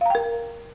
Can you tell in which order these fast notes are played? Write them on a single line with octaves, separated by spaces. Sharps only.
F5 A#5 G5 A#4